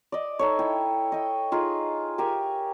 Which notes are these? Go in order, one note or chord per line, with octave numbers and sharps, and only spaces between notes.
D5 D#5
D#4 A4 C#5
E4 G5
D#5 G5
D#4 F4 G#4
G4 A#4 E5 G#5